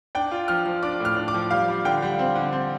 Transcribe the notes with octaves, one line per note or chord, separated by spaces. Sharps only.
D4 G5
F4
F3 F6
F3
D4 D6
A2 F6
D4
D6
F3
G3 F5
G3
D3 G5
G3
C4
D3
C4